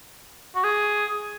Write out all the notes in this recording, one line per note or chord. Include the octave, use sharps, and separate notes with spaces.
F#4
G#4